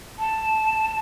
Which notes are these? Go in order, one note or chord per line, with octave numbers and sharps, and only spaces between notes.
A5